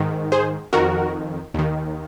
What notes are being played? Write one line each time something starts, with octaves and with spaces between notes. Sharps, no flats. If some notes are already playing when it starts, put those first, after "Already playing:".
Already playing: G#2 D#3
G#4 C5
F2 D#3 F#4 A#4
D#2 D#3